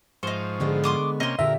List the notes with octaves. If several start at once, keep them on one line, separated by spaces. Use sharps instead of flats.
G#2 F3 D#4 C5 C#6
D3 G#3 B3
C6 D6 D#6
C3 A#3 C#4 D#5 C6
A#2 D3 G4 A#4 E5